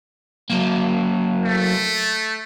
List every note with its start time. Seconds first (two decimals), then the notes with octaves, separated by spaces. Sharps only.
0.50 F#3 A#3
1.45 A3